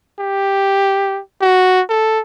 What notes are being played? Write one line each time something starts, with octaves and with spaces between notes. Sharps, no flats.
G4
F#4
A4